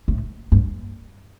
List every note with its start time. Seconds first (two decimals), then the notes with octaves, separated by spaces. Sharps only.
0.08 A2
0.52 G2